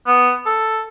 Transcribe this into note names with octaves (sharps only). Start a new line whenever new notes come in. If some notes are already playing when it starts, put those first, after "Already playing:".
B3
A4